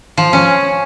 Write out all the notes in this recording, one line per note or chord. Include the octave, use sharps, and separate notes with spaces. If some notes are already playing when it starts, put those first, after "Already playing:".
F3
C#4